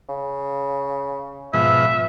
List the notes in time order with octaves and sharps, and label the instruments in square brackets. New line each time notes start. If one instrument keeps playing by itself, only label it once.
[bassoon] C#3
[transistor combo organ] G#2 B2 F3 [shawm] E5